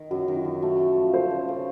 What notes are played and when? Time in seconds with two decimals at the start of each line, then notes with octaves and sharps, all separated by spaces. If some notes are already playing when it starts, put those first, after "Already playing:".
Already playing: D#3
0.11 F#2 F#4
0.28 D#3
0.37 F4
0.45 F#2
0.62 A3 F#4
0.80 A3
0.96 F3
1.14 A3 C5
1.31 C#3
1.49 C#3